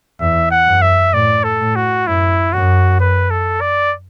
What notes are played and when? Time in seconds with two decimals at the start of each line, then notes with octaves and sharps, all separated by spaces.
0.21 E2 E5
0.51 F#5
0.67 F#2
0.82 E5
1.13 A2 D5
1.44 A4
1.60 A2
1.76 F#4
2.07 F#2 E4
2.53 F#2 F#4
3.00 B4
3.31 A4
3.61 D5